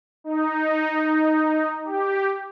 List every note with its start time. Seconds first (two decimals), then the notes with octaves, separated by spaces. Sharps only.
0.24 D#4
1.85 G4